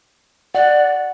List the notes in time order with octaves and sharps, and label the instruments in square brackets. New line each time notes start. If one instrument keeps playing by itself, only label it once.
[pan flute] D5 [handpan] F#5